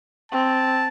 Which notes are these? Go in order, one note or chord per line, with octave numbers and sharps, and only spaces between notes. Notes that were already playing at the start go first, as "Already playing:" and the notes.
C4 A5